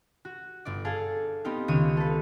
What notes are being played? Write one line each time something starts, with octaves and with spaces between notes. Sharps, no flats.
F#4
G1 D5
G#4 A4 F5
B3 C4 D#4 G4 F5
C#2 D#3 C#5 D#7
A4 B4